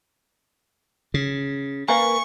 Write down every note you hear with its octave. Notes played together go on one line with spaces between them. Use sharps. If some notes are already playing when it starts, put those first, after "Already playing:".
C#3
A#3 A#4 B4 F5 G#5 C#6